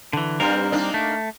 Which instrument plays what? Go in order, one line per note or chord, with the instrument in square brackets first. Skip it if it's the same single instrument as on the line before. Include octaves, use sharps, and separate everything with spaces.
[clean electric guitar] D3 E3
[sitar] G2 [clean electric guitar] G3 C4 A#4
[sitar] A#3 D4 D#4
[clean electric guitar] A3